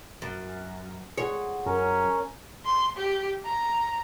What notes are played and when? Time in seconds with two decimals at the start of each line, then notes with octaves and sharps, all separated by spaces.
0.22 F#2
1.18 G#3 G#4 C#5 F#5
1.66 F#2 C#4 A#4
2.65 C6
2.97 G4
3.45 A#5